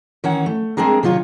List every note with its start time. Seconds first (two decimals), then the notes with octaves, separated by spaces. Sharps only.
0.24 D#3 E3 C#4 F#5
0.46 A3
0.77 G#3 C4 D4 G#4 A#4
1.03 C3 D#3 F#3 F4 C#5